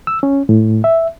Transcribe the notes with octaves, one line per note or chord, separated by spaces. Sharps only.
E6
C#4
A2
E5